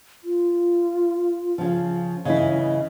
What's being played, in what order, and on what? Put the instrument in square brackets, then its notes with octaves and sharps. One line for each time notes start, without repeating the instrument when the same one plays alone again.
[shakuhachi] F4
[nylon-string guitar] C#3 F3
[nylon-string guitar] C#3 E3 E4 [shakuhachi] D#5